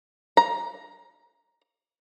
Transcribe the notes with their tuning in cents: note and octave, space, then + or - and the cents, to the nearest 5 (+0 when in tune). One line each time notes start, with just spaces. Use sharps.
A#5 +15